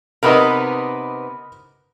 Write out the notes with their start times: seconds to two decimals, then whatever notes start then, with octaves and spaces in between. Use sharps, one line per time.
0.23 C3 B3 D#4 A#4 B4 D#5